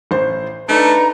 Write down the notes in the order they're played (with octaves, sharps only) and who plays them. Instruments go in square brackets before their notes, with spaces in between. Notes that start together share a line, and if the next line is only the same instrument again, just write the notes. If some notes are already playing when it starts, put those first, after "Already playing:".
[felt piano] A1 C5
[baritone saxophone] A3 [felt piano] D4 D#4 [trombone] B4 [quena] A#5